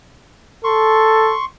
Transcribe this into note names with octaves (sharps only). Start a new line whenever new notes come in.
A4 C6 C#6